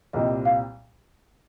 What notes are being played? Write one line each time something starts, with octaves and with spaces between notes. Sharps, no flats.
C2 A#2 G3 C4 D#5
F5